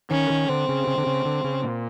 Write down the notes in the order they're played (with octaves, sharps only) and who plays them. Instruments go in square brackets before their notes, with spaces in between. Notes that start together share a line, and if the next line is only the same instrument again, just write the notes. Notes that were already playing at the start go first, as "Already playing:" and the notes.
[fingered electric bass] D#3 [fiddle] C#4
[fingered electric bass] D#3
[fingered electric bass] D3 [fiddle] C4
[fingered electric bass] C#3
C#3
D3
C#3
D3
C#3
A#2